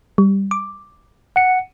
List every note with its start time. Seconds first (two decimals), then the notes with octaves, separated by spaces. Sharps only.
0.18 G3
0.51 D6
1.36 F#5 C#7